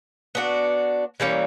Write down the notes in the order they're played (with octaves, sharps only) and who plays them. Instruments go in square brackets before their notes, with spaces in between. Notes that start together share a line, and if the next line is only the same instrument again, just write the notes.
[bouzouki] B3 D4 F#4
E3 G3 A#3 C#4